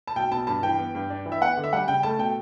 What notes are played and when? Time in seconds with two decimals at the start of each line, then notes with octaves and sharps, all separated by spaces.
0.07 A5
0.16 B1 G5
0.31 B2 A5
0.47 G2 A5
0.63 E3 G5
0.78 B3
0.95 G2
1.10 D4
1.26 E3
1.32 E5
1.41 B3 F#5
1.57 D3
1.64 E5
1.73 G3 F#5
1.87 C#3 G5
2.03 A3 A5
2.19 B2 G5